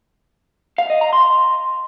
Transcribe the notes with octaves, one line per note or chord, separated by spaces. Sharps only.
F5
D#5
A#5
C6